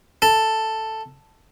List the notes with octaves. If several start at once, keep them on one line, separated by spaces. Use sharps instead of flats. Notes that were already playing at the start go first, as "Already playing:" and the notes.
A4